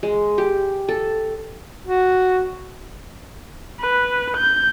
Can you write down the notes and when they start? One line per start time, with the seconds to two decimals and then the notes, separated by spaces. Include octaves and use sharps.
0.03 G#3
0.38 G4
0.88 A4
1.86 F#4
3.81 B4
4.38 G6